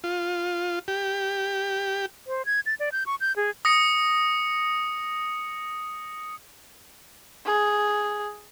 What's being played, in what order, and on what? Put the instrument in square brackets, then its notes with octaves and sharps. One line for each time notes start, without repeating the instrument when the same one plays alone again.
[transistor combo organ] F4
G4
[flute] C5
G#6
A6
D5
G6
C#6
G6
G#4
[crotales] D#6 A#6 C#7
[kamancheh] G#4